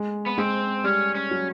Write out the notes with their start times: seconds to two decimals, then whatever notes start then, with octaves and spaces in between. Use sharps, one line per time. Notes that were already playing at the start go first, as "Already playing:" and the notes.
Already playing: G#3
0.26 B3
0.38 G#3 C4
0.84 G3 C#4
1.15 C#4
1.31 F#3